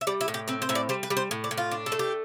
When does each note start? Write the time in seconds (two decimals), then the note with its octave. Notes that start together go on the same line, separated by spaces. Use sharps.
0.01 E5
0.07 G3 D5
0.21 E4
0.28 A2
0.34 G4
0.48 C4 B4
0.62 C5
0.69 A2 E5
0.75 D5
0.89 G3 C5
1.03 B4
1.10 G3
1.17 C5
1.31 A2
1.44 D5
1.51 A2
1.57 F4
1.71 D4
1.86 A4
1.92 A3
1.99 G4